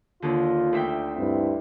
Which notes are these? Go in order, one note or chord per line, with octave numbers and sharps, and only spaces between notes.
D#2 D3 F4
D2 E5 G5
G2 C4 E4